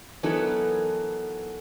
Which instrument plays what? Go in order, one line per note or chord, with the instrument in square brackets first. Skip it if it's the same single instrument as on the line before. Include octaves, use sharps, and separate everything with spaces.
[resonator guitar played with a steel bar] E3 F#3 B3 D#4 A4 A#4